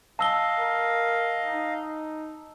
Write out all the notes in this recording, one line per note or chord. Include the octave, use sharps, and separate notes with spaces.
D#5 F5 A5 E6 G7
A#4
D#4